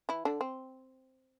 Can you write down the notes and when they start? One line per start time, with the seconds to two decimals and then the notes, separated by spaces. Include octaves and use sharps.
0.09 E3 E4
0.25 D3 D4
0.41 C4